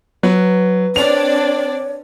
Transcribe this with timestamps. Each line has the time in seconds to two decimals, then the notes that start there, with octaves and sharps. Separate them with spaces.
0.23 F#3 B4
0.96 C4 D4 C#5 D5 F7